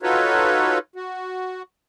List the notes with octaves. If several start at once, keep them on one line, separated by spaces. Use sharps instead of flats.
D#4 F4 F#4 A4 B4 C#5
F#4